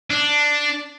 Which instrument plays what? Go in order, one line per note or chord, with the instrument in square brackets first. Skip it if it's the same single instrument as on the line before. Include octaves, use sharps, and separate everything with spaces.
[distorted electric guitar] D4